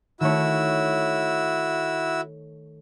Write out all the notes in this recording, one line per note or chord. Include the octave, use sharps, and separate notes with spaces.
D#3 A3 E4 F#4 C#5 E6